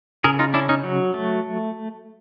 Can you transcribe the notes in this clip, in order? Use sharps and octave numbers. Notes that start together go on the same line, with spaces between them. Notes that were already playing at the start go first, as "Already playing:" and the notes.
C#3 G#4 A#4
D#4 F4
C#4 D4 E4
C#4 D#4
F#3
A3